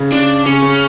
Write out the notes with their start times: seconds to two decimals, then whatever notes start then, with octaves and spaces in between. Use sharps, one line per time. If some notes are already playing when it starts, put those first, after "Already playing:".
Already playing: C#3
0.12 C#3 D4
0.46 C#3 C#4
0.62 C#3